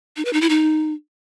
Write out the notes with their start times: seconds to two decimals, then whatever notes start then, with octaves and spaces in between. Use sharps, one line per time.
0.17 D#4
0.25 B4
0.33 D#4
0.41 E4
0.50 D#4